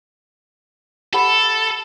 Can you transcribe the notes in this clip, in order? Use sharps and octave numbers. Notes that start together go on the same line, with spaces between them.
G4 A4 F#5 B5